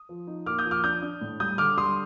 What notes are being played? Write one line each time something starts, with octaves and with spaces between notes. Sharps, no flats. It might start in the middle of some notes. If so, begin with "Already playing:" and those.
Already playing: D#6
F3
D#4
A#3 D6 F6
D#6 G6
F3
D6 F6
D4 D#6 G6
D4
A2
G3 D#6 G6
D3 D6 F6
G3 C6 D#6